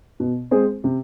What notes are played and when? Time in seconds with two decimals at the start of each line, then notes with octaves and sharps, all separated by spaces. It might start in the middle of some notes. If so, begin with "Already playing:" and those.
0.20 B2
0.51 G#3 C4 G#4 C5
0.84 C3